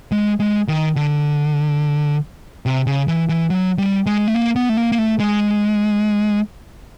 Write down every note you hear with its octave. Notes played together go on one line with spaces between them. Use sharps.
G#3
G#3
D#3
D3
C3
C#3
E3
E3
F#3
G3
G#3
A3
A#3
B3
A3
A#3
A#3
A3
G#3